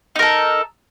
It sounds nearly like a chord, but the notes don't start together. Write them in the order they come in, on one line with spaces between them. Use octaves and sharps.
D#4 A#4 A4